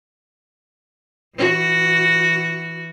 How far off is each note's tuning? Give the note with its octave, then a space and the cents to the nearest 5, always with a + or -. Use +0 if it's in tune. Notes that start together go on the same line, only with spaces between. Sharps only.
E3 +0 F#4 +0